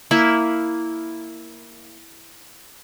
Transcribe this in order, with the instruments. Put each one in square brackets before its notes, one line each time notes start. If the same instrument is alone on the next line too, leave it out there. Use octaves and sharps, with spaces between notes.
[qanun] A#3 E4